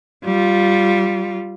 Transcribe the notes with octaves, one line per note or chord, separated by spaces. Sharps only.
G3 F4